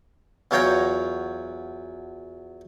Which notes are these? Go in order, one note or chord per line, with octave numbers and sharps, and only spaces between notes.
E2 F#3 F4 C#5 G5 A#5